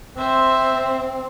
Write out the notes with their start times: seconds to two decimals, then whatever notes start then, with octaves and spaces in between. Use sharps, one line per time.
0.18 C4 C5 E5